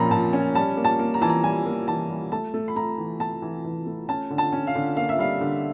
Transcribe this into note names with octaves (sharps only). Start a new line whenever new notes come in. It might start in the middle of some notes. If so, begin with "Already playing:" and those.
Already playing: A#2 F3 C#4 A#5 B5
A#2 A5
C#4
G3 A5
A#3
A5
A#3
A#5
E3 A5
A#5
G3 G#5
A#3
E3 A5
G3
A3 A5
A3
B5
A3 A#5
E3
A3 A5
E3
E3
A3
C#4 A5
D3
A5
C#4
F5
D3
A#3 F5
E5
G3 F5
D3